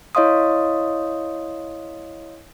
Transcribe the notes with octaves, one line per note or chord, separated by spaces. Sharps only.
E4 C#5 D#5 F5 C6 D#6